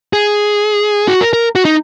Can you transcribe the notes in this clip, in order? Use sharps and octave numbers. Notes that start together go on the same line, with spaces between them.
G#4
F#4
A#4
A#4
F#4
D#4